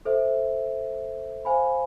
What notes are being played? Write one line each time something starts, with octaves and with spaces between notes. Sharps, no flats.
A4 C5 E5
C5 F5 G#5 B5